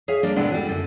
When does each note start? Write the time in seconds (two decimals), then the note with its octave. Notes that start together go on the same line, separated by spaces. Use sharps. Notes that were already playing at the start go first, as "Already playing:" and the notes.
0.08 G#4 C#5 E5 F5
0.23 G3 A#3 D4
0.36 D#2 A2 C3 G#3 B3 D4
0.52 A2 G3 F#4
0.66 F#2 D3